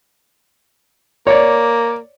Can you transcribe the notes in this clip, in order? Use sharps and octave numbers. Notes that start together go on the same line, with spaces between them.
A#3 C#5 D5